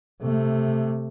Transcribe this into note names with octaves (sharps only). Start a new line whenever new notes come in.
C3 A3